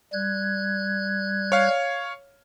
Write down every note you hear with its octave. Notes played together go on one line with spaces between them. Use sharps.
G3 F#6 G#6
C#5 F5